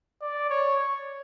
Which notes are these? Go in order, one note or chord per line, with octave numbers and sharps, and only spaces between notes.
D5
C#5